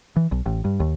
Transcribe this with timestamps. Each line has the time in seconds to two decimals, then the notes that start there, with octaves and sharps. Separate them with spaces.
0.16 E3
0.32 B1
0.46 A1
0.65 G2
0.80 D#2